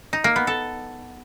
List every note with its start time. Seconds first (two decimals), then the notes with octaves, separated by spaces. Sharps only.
0.13 D#4
0.24 A#3
0.36 B3
0.47 A4